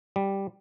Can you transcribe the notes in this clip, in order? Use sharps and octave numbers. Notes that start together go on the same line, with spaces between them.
G3